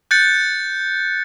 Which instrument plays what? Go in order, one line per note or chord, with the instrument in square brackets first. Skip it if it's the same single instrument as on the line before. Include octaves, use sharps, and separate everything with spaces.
[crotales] F#6 G6 A6 C#7